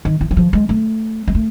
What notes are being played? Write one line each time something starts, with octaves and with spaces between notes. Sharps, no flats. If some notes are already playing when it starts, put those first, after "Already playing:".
D#3
E3
E3
F3
G#3
A3
G#3
A3